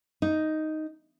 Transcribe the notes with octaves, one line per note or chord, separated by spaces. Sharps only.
D#4